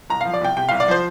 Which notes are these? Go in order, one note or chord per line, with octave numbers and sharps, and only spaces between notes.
C2 A#5
F3 F5
D5
C2 G5
C3 G5
C2 F5
D5
F3 C5